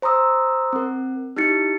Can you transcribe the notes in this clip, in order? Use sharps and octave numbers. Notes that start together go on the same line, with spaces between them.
C5 A#5 C6 D#6 E6
C4 A#4
D#4 E4 G4 A6 C#7